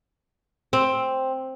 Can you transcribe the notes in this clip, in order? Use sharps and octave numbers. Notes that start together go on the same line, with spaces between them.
C4